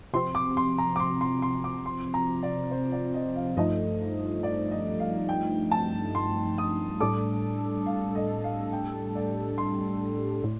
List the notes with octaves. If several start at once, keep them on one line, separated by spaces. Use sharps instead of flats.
C3 F3 C4 C6
D6
C6
A#5
D6
C6
C6
C6
D6
C6
A#5
D5
C5
D5
D#5
F5
G2 F3 A3 D#4 D#5
D5
D#5
F5
G5
A5
C6
D#6
A2 G3 D4 A4 D6
F5
D#5
F5
G5
D5
C6
A2